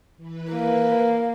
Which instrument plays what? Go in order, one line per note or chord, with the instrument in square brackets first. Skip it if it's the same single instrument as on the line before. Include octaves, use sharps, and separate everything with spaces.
[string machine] E3 B4
[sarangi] A#3